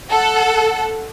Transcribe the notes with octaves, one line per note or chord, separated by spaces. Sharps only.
A4 F#5